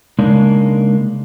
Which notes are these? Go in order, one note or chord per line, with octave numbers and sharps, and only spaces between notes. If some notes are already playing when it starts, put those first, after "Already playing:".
C#3 G#3 A#3 D4 D#4